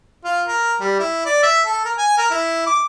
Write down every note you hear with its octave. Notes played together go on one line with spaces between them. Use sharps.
F4
A#4
G3
E4
D5
E5
A4
A#4
G#5
A#4
E4
D6